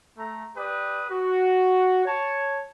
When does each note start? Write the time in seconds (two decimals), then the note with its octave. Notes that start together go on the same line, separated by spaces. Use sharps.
0.17 A3 A#5
0.57 G4 B4 D5 D#6
1.11 F#4
2.06 C#5 A5